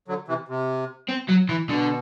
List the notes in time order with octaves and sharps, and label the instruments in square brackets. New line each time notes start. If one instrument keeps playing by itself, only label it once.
[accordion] D3 F#3
C3 E3
C3
[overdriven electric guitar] C4
F#3
E3
[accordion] B2 [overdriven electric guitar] D3